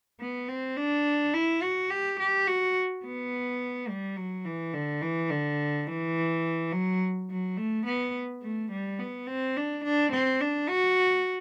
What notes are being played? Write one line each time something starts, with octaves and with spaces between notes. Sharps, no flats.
B3
C4
D4
E4
F#4
G4
G4
F#4
B3
G3
F#3
E3
D3
E3
D3
E3
F#3
F#3
A3
B3
A3
G3
B3
C4
D4
D4
C4
D4
F#4